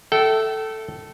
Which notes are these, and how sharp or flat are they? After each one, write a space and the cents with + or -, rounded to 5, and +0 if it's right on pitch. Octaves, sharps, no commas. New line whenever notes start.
A4 +0 E5 +0 G5 -35